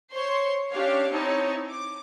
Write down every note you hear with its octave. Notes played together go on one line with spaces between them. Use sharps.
C5 C#5 C6 C#6
C#4 D4 G4 C#5 F5
C4 D#4 E4 C#5 A5
D6